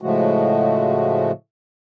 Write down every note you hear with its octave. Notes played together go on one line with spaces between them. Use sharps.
A2 C#3 F3 G#3 A3 F#4